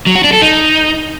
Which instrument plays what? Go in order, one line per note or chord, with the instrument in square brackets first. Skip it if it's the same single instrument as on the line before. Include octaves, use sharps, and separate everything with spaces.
[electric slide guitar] F#3
F#4
D4
A4
D#4